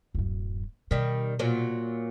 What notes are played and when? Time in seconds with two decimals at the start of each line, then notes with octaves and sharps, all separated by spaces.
0.15 D1 F#2
0.91 B2 D#3 G3
1.39 A#2 F#3